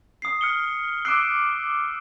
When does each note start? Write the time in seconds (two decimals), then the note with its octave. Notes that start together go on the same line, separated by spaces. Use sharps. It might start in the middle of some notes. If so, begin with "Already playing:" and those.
0.22 D#6 C7
0.41 F6 C#7 G7
1.05 D6 E6 F#6 C7 D7